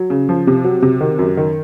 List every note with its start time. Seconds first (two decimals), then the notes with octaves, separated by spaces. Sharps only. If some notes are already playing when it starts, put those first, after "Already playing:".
Already playing: F#3
0.10 C#3
0.29 F3
0.47 C3
0.64 F#3
0.82 C3
1.01 D#3
1.19 F#2
1.37 D#3